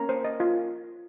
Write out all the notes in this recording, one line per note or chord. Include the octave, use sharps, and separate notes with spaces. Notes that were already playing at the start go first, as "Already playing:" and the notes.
Already playing: A#3 C#4 A#5
C5
D#5
F4